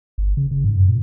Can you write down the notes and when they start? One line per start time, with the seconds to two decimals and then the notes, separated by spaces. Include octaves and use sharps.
0.18 G1
0.37 C#3
0.51 C#3
0.64 G#2
0.76 F#2
0.88 A#2